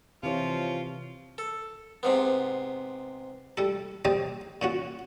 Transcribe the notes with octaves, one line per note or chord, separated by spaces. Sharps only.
C3 E3 F3 C#4 F4
A4
G#2 C3 B3
G3 A4
C4 D#4 G4 C5 D5 D#5
A#2 C#4 F#4